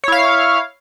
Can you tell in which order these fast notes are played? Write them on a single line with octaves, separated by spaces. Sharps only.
C#5 E4 F5